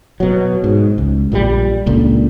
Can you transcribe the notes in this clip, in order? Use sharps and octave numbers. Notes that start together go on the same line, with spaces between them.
B2 F#3
G#2
C#2
A#1 A#2 D3 G3
C#2 A#2 D3